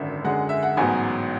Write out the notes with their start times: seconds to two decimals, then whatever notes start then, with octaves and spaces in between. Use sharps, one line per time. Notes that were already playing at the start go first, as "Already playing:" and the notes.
Already playing: G#1 F#2 D3 E5
0.24 F#2 D3 G#3 F#5
0.49 E5
0.63 F#5
0.77 A1 G#2 F#3 B3 G#5